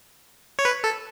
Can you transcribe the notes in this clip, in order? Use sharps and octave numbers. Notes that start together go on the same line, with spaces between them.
C#5
B4
A4